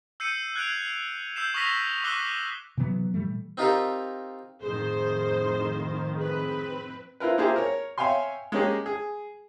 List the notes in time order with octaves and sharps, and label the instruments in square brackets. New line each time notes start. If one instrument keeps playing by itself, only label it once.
[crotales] E6 G6 C7 C#7 D#7
F#6 G#6 C7 D7 F7
C7
E6 G6 C7 E7
C#6 D#6 F6 A#6 B6 F7
C#6 D6 E6 F#6 C7 G7
[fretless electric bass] C3 E3 F#3 B3
A#2 E3 G3 A3
[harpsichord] C4 D#4 F4 G4 A4 A#4
[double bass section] F2 A2 D#3 [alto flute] G#4 [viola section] C5
[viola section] C4 B4 [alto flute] G#4
[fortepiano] C4 E4 F4 A#4 B4
A#3 E4 F4 G4 G#4 C5
A#4 C#5
C#5 E5 F5 G5 G#5 C6
G#3 A#3 C#4 G4 G#4
G#4